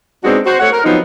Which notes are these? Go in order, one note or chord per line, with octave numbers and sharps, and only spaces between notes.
G#3 B3 C4 D4 D#4 F#4
F#4 C5
A3 C#5 F#5
A#4
F3 F#3 B3 C4 D#4